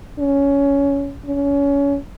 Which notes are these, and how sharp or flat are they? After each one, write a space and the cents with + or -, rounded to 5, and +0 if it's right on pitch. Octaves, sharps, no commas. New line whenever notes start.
C#4 +15
C#4 +25